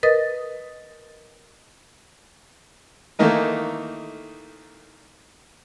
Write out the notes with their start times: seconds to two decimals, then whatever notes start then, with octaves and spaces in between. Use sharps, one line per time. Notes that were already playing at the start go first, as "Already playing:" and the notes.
0.03 A#4 B4 D#5 D#6 A6
3.19 D#3 E3 A3 A#3 D#4 A#4